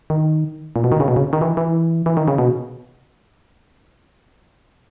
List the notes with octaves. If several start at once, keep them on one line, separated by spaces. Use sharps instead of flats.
D#3
A#2
B2
D#3
C#3
B2
C#3
D#3
E3
E3
E3
D#3
C#3
B2